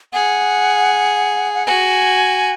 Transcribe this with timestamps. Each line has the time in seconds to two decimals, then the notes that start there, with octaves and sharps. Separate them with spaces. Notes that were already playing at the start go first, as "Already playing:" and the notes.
0.13 G#4 F#5
1.54 F#5
1.66 F#4 G#5